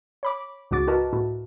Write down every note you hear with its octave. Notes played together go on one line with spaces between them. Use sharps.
C#5 B5 D6
C#2 G#2 F#4 D6 A6
E4 F#4 A#4 B4 D#5 A5
A2 E4 F#4